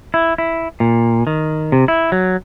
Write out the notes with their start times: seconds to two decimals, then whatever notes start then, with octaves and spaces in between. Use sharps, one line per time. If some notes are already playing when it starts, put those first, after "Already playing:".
0.14 E4
0.38 E4
0.80 A#2
1.27 D#3
1.72 C3
1.88 E4
2.12 F#3